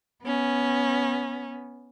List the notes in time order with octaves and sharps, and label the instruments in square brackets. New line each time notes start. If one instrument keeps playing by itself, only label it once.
[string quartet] B3 C#4